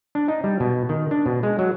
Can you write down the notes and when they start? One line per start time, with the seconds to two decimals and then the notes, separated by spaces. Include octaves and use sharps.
0.15 D4
0.28 D#4
0.44 G3
0.60 B2
0.89 D#3
1.11 D4
1.26 B2
1.43 G#3
1.59 F#3